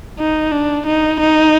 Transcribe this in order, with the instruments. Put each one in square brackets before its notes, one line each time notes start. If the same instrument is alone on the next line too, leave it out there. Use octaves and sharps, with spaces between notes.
[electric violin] D#4
D4
D#4
D#4